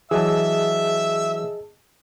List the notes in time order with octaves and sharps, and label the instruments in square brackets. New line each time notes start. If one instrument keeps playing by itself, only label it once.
[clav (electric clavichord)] E3 F#3 [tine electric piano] G#4 D#5 A5 [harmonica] E5 E6